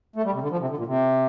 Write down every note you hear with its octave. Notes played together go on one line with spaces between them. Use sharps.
A3
G3
C3
D3
F3
C3
D3
A#2
C3